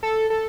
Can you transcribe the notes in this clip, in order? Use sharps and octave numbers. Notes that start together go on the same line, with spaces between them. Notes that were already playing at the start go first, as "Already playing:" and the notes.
A4
A4